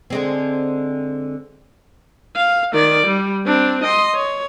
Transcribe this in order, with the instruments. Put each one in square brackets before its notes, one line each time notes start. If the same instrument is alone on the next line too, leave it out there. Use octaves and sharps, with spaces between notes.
[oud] D3 G#3 C4
[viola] F5
D#3 D5
G3
C4 D4
D#5 C6
C#5